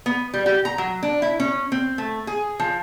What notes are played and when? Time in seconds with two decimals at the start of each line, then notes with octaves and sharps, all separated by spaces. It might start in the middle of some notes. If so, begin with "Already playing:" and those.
0.06 B3
0.34 G3
0.46 G4
0.65 A#5
0.78 F#3
1.03 D4
1.22 E4
1.40 C#4
1.72 C4
1.98 A3
2.27 G#4
2.59 F3